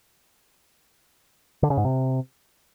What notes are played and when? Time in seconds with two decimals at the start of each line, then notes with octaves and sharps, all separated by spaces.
1.63 D3
1.70 C#3
1.77 G#2
1.85 C3